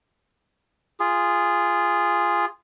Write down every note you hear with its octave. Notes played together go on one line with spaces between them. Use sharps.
F4 G#4